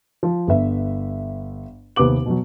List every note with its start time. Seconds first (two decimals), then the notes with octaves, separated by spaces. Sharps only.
0.23 F3
0.47 G1 B4 E5
1.96 D#2 C3 B3 G4 D6 F#7
2.26 B2 F#3